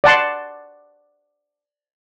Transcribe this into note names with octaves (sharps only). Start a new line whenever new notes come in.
D5 F#5 A5 C6